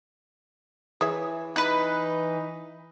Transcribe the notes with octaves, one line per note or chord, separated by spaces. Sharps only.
E3 G#4 C#5 E5
D#4 B4 F#6